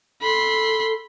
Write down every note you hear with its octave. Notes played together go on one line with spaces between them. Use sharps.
A4 B5 C6